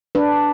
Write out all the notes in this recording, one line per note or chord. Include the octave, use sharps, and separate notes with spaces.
D4 B4